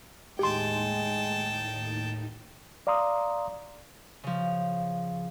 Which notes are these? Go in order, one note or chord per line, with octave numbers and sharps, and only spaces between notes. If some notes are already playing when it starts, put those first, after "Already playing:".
D#2 A2 G#3 D#4 G4 G5 A5 C6
D5 F5 A#5 C6 D#6
C#3 F3